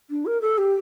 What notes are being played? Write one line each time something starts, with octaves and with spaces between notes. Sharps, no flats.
D4
A#4
A4
G4